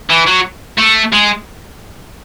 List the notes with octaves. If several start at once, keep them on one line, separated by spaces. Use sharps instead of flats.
E3
F#3
A3
G#3